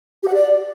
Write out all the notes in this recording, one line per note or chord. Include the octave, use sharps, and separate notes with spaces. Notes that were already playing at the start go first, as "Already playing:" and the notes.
G4
F#5
D5